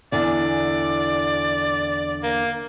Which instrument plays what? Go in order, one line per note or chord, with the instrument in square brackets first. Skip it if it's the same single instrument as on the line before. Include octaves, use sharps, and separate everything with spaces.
[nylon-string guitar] E2 D3 G#5 [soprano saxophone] D5
[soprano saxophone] A#3